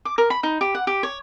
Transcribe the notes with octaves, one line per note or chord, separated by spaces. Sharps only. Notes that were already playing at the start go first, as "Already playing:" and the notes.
D6
A#4
B5
D#4
G4
F#5
G4
C#5